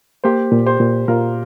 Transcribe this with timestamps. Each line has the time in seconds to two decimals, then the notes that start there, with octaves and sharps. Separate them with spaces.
0.24 A#3 G4 C5
0.52 A#2
0.66 G4 C5
0.80 A#2
1.08 A#2 F4 A#4